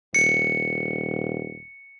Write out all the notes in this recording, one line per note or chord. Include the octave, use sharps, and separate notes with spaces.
D#1 C#7